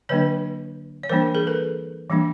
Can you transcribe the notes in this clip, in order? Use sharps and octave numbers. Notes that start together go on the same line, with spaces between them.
D3 F#3 A#3 D4 B4 C#5
C#5
E3 G3 A#3 D4 A#4 C5
G#4 A#4
A4 B4
E3 G3 A#3 D4